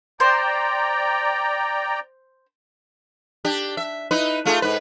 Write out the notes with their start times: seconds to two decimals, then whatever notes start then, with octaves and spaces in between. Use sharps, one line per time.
0.20 C5 D5 G5 A#5
3.44 D4 G4
3.77 E5
4.11 D#4 E4 B4
4.45 A3 F4 G#4
4.62 G#2 B4